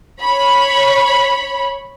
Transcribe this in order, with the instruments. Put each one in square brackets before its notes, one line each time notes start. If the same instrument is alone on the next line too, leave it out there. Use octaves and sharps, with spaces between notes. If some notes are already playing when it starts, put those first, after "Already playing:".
[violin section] C#5 B5